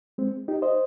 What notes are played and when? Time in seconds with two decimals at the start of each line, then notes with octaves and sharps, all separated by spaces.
0.18 G#3 C4
0.48 D#4 G4
0.62 C5 D#5